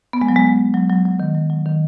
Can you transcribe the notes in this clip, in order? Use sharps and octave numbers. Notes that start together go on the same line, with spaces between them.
B3
G#3
F#3
G#3
F#3
F#3
F#3
D#3
F#3
F#3
D#3